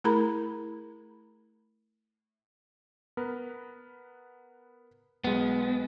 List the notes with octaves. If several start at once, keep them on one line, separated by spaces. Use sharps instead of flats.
A3 E4 G#4 A#4 A#5 B5
B3 A#4 B4
B1 G#3 B3